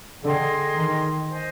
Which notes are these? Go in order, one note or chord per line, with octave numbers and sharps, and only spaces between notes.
D3 G#4 D#5 G5 C6
D#3
C5 D#5 G#5